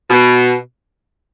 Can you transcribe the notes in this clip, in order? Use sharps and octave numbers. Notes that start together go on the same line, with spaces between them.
B2